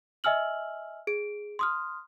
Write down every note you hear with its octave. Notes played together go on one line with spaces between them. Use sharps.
D#5 E5 G#5 E6 F6 F#7
G#4 D7
C6 D#6 F6